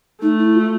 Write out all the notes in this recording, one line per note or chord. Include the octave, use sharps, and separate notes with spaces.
A3 D#4
E4
F4